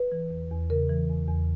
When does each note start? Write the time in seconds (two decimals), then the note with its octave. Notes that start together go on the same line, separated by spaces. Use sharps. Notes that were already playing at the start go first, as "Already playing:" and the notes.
Already playing: B4
0.12 E3
0.31 E2
0.51 E2
0.70 C#3 A#4
0.89 E3
1.09 E2
1.28 E2